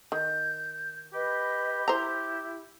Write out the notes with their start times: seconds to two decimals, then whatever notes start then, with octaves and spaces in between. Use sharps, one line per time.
0.12 D#3 G6
1.13 G4 B4 D#5 B5
1.88 E4 C5 A#5